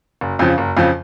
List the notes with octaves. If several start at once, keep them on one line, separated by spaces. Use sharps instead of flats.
F#1
F2 C#3 F3
F#1
F2 C#3 F3